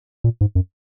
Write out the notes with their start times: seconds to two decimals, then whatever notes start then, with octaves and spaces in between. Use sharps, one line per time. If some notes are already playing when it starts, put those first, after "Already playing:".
0.24 A#2
0.41 G#2
0.55 F#2